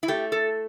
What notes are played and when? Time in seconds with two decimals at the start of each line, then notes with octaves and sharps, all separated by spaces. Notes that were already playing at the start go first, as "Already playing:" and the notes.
0.03 E4
0.08 A3 G4
0.32 A4